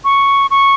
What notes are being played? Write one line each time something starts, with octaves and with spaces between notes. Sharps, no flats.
C#6
C#6